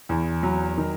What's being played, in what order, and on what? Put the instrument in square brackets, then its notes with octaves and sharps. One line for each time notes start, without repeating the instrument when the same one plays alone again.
[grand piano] E2
F#3
D#3